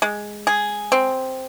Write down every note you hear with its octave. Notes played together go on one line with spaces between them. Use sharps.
G#3
G#4
C4